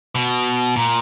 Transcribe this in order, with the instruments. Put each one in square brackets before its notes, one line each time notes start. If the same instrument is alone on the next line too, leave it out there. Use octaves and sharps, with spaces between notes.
[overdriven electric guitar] B2
A#2